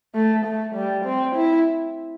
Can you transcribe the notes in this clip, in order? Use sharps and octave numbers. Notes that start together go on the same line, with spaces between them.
A3
A3
G3
C4
E4